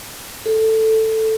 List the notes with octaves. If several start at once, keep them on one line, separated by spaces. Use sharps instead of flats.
A4